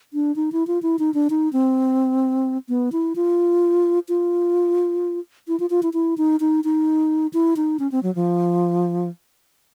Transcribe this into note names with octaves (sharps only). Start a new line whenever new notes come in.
D4
D#4
E4
F4
E4
D#4
D4
D#4
C4
B3
E4
F4
F4
E4
F4
F4
E4
E4
D#4
D#4
D#4
E4
D#4
C#4
C4
F#3
F3